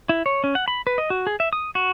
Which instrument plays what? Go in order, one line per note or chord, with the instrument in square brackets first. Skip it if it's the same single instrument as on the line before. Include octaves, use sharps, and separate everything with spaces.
[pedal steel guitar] E4
C#5
C#4
F#5
B5
B4
D#5
F#4
G#4
E5
D#6
F#4